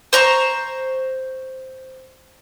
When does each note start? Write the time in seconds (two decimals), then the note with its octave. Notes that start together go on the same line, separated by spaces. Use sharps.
0.13 C5 A#5 C#6